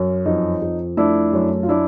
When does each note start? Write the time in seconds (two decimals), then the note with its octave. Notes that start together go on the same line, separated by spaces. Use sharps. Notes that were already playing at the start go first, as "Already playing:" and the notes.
Already playing: F#2
0.26 F2 D#4
0.62 F2
0.97 A3 D4 E4
1.33 F#2
1.63 F4
1.69 D4 E4